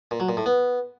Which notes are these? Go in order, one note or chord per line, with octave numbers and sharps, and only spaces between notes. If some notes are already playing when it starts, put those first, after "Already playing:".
A#2
F#3
A#2
A2
B3